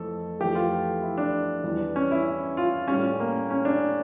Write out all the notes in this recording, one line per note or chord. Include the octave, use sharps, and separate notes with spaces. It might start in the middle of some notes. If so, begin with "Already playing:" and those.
Already playing: F2 E3 A3 A4
F2 E3 A3 G4
F4
E4
D4
E2 E3 G3
C#4
E4
F4
A2 G3 C#4
A#3
C#4
D4